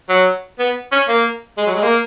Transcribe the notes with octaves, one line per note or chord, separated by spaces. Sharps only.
F#3
B3
C#4
A#3
G#3
F#3
G#3
A#3